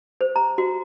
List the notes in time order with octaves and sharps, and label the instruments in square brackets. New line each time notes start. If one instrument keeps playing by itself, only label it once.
[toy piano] C5
A#5
F#4